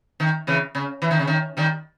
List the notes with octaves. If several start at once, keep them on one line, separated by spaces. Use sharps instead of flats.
D#3
C#3 E3
C#3
E3
D#3
C#3
D#3
D#3 G3